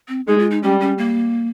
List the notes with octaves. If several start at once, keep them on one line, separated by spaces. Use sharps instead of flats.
C4
G#3 D#4
F4
D#4
G3 C#4
C#4
A#3